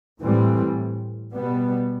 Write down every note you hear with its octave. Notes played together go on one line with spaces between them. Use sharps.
A2 E3 G3 C4
B2 G3 B3